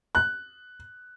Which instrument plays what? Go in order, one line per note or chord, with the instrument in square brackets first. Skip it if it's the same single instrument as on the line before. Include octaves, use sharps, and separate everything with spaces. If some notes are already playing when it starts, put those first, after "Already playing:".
[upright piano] F#6